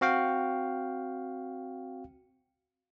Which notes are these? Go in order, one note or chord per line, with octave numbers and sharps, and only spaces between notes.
C4 F#4 F5 G5